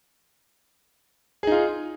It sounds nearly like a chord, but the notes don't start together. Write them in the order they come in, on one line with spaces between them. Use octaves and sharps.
G#4 D#4 F4